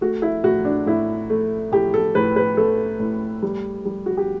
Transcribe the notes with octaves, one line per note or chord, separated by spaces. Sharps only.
A3 F#4
E4
A2 F#4
D4
A2 E4
A3
A2 G4
A4
A2 B4
B4
A3 A4
A2
G3
G3
F#4
G4